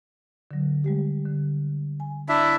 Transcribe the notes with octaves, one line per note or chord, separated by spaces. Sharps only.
D3 F#3
G3 G#3 G4
D3
G#5
D4 E4 E5